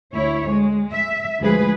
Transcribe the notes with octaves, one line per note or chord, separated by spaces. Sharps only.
D2 E4 C#5
G#3
E5
D2 F3 G#3 G#4 B4